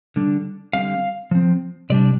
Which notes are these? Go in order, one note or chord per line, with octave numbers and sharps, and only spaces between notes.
D3 G3 D4
D3 G3 C4 F5
F3 C4
C3 G3 D4 D5